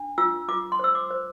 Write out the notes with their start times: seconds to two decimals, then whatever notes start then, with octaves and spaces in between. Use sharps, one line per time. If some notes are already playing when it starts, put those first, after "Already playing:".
Already playing: D4
0.18 F4 E6
0.49 F4 D6
0.72 C6
0.79 C5 E6
0.95 D6
1.11 C5